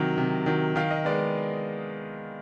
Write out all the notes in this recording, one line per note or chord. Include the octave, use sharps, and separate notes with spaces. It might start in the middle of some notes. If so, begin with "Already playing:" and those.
Already playing: C3 D#3 F#3
C3
D#3 F#3
D#3 F5
D#5
G#3 B3 D5